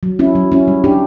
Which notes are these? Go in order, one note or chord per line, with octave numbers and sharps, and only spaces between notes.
F#3
C#4 E4
F#3
C#4 E4
G3
D4 G4